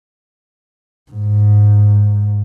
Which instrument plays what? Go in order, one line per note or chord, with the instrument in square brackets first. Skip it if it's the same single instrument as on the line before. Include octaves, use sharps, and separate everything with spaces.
[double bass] G#2